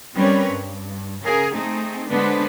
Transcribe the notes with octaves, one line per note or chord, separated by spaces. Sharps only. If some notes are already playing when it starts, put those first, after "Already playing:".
G3 C4 C#4 A#4 B4 C#5
G2
C#3 G#4 A#4
A3 C4 D#4 G#4
D3 G#3 B3 D4 B4 C5